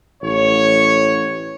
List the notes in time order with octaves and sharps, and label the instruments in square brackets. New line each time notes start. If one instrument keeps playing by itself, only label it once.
[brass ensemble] A1 C#5